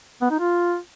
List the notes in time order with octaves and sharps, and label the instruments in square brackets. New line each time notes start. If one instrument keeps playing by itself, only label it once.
[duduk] B3
D#4
F4